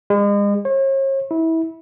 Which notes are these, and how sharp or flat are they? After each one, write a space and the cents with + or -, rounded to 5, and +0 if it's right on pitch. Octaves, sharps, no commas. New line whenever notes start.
G#3 -40
C#5 -40
E4 -25